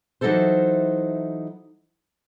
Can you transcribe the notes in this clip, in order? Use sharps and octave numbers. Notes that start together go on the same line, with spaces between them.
E3 F#3 D#4 E4 A4 C5